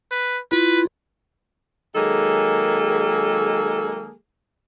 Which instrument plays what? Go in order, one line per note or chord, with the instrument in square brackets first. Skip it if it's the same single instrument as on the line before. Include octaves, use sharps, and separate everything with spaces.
[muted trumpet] B4
[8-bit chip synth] E4 F4 [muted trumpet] B4
[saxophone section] D#3 F#3 G#3 A#3 G#4 A4